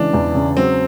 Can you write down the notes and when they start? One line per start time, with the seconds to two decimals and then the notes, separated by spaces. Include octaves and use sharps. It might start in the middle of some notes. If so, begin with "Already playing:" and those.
Already playing: C#3 E3 G#3 D4
0.13 E2
0.35 C#3
0.57 F#3 C4